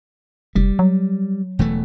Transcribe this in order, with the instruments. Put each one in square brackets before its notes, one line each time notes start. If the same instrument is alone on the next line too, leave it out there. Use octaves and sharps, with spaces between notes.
[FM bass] F1 [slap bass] G3
[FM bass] F#3
[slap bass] E1 E3 A3